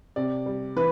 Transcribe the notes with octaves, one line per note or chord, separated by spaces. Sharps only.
C3 D5
G3
E3 B4